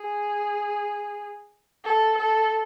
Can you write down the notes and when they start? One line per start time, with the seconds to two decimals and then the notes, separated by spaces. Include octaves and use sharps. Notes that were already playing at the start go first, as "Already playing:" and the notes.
Already playing: G#4
1.84 A4
2.18 A4